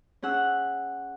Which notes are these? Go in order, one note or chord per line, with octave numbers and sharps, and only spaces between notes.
C#4 G#4 F#5 E6